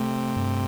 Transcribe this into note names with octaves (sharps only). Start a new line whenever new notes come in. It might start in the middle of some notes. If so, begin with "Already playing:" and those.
Already playing: C3 A3
G2